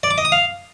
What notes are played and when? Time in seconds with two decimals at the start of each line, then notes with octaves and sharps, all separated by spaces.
0.03 D5
0.11 D6
0.18 D#5
0.25 D#6
0.32 F5